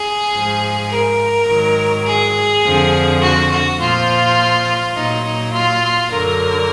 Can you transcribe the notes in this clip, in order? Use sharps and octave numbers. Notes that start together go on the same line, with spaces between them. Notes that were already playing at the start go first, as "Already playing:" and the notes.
Already playing: G#4
G#2 F3
A#4
G#2 D#3 F#3
G#4
F2 D3 F3
F#4
F#4
A#2 F3 F4
A#2 F#3 D#4
D#4
F4
F#2 D3 F#3 A#4